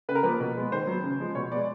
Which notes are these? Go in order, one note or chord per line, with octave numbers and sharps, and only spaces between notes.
C#3 B4
A#4
F3 A#3 B4
B2
G#3 B3
D#3 C5
F#3 B3
C#3
F3 G#3
B2 C#5
G#3 B3 D5